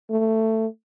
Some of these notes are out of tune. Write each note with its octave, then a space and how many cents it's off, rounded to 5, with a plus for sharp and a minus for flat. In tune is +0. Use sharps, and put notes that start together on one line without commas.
A3 +15